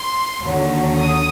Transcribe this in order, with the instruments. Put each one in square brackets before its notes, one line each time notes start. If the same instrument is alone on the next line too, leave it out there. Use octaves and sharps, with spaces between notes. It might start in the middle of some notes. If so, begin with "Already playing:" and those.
Already playing: [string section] C6
D#2 D3 F#3
D#6